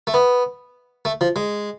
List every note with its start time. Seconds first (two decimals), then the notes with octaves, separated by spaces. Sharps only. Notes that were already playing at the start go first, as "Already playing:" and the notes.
0.07 A3
0.14 B3
1.05 A3
1.21 F3
1.36 G#3